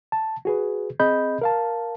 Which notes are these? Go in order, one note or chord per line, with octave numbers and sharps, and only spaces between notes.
A5
F#4 G#4 B4
C4 G#4 D#5 B5 G6
A#4 F5 A5